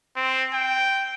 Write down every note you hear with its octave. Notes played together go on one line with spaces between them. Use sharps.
C4
G5